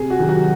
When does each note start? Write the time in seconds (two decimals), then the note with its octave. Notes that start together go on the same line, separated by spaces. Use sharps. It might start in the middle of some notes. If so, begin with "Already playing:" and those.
Already playing: C3 G#4
0.10 F#4
0.19 D#3 F#3
0.28 F#4